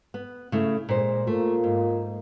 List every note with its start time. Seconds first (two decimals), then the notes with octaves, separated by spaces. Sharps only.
0.14 B3
0.52 C#3 A3 E4
0.89 A#2 G#3 C5
1.27 A3 A#3 F4
1.64 G#2